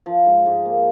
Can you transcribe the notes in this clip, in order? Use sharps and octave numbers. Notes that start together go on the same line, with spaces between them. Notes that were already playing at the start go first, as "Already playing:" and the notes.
F3
G#2
G#2
A#3